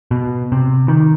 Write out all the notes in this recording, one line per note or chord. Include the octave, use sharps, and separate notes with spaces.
B2
C3
D#3